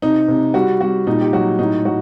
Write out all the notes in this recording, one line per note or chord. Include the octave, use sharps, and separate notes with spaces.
C3 D#4
C3
G3 F#4
G3 F#4
A#2 D#4
G4
F#3 F#4
A2 D#4
F#3 F#4